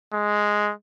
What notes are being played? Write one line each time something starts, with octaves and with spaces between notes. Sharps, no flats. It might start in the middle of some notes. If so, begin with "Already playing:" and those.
G#3